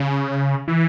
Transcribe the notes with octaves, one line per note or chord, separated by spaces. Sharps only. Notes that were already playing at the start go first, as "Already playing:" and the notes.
Already playing: C#3
E3